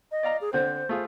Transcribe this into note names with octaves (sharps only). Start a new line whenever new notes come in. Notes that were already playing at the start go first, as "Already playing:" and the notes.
D#5
D5 F5 A#5
G#4
D3 C4 C5
A3 F4 G#4